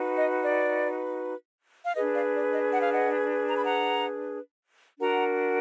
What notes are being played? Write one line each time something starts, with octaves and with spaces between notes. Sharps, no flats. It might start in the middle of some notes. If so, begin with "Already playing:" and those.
Already playing: D#4 F#4 B4
D#5
D5
F5
D4 G#4 B4 D#5
D5 F5
D5
D#5
F#5
F5
D#5 F#5
A#5
B5
F#5 A#5
D4 F#4 A#4 F#5 A#5